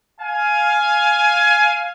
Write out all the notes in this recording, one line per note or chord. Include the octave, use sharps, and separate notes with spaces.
F5 G#5